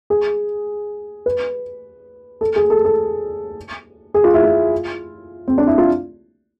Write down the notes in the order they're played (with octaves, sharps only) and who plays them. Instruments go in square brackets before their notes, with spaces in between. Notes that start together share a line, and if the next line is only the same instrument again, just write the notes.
[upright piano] G#4
B4
A4
G#4
A4
A4
G#4
F4
E4
F4
C4
D4
E4
F4